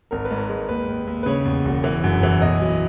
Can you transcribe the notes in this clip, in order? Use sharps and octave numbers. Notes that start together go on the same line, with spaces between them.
G#1 A#4
B4
G#2
A#4
G#3
D#2 B4
D#2
D#2
B4
C#3 C#5
E2
E1
E3
F#2
E3
B1 D#5
F#3